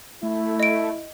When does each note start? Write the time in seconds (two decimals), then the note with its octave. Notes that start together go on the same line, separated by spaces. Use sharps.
0.23 A3 E4
0.60 D#5 D7